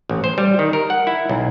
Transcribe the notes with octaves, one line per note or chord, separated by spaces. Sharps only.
A1
C5
G3
D#3
A#4
F#5
E4
B1